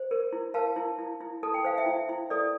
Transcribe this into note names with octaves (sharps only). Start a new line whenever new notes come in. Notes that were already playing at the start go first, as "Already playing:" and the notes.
Already playing: C5
A#4
E4
A#4 F5 A5
E4
E4
E4
A4 A5
G5
C5 F5
E5 G5
E4
E4
A4 D5